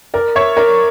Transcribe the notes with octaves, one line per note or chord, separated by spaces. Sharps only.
A#4 D5
C#5 E5
A#4 D5